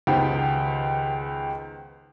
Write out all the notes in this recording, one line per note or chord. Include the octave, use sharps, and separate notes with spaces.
C#2 D#3 B3 G4 C5